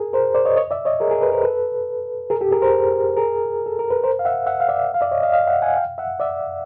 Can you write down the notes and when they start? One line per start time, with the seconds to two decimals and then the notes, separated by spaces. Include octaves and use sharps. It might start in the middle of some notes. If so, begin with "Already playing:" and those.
Already playing: G#4 A#4
0.13 A#4 C5
0.35 C5 D5
0.45 C#5 D#5
0.56 C#5 D#5
0.71 D5 E5
0.85 C#5 D#5
1.00 G#4 A#4
1.11 G#4 A#4
1.21 A4 B4
1.32 A#4 C5
1.43 A4 B4
2.30 G#4 A#4
2.41 G4 A4
2.51 G#4 A#4
2.62 A#4 C5
3.17 G#4 A#4
3.66 A4
3.79 A#4
3.90 B4
4.04 A#4 C5
4.19 F5
4.25 E5 F#5
4.46 E5 F#5
4.60 F5
4.69 D5 E5
4.94 F5
5.01 D5 E5
5.11 C#5 D#5
5.22 D#5 F5
5.33 D#5 F5
5.47 E5 F#5
5.62 F#5 G#5
5.76 F5 G5
5.98 E5 F#5
6.20 D5 E5